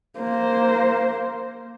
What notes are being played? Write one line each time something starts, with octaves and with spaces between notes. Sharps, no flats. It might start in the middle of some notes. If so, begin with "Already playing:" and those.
A#3 C5